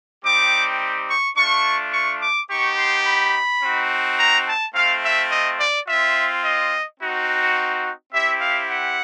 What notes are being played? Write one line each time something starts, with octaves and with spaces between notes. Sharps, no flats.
G3 C4 D#4 G4 D6
C#6
A3 D4 F4 C#6
C#6
D6
B3 D#4 G4 C#6
C6
B5
C4 D#4 F#4
A#5
A5
A3 C4 F4 F5
E5
D#5
D5
C4 F4 E5
D#5
C4 D#4 F#4
C4 E4 G4 E5
F5
F#5